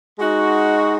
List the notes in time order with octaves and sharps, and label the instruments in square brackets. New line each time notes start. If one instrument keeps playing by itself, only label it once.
[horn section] G#3 D#4 F#4